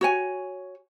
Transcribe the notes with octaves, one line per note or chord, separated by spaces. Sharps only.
F#4 C#5 G#5